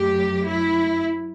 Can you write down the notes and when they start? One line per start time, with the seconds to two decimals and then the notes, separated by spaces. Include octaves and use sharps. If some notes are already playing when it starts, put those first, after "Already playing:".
Already playing: F#2 F#3 A3 G4
0.46 E4